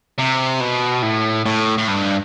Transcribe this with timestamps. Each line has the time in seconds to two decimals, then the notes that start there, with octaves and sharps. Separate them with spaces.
0.18 C3
0.60 B2
1.03 A2
1.46 A2
1.78 A2
1.88 G2